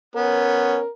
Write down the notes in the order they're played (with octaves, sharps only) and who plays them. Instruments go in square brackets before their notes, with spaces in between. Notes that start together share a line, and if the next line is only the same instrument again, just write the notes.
[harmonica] B3 C#4 [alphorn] A#4